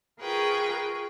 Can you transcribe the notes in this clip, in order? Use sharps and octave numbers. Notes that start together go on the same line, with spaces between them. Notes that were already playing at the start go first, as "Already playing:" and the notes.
F4 G#4 A#4 B4 G5 C#6